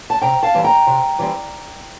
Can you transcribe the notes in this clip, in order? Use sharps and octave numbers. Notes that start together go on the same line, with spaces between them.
A5
C3 G5 A#5
F5 A5
E3 G3 C4
G5 A#5
C3
E3 G3 C4